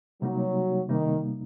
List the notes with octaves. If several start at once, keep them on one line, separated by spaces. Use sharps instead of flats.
C3 F#3 G3 A#3 D#4
C3 D#3 G3 A#3 D#4